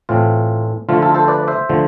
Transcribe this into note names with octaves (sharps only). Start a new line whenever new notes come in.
A2 E3 A3 C4 F4
D3 F3 A3 F4
F4 A4
A4 C5
B4 D5
C5 E5
D3 F3 A3